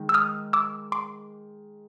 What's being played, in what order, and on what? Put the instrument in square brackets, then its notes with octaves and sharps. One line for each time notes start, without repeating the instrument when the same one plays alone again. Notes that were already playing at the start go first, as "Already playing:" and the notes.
Already playing: [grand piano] D#3 G#3
[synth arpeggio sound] E6
D#6 F6
D6 E6
C6 D6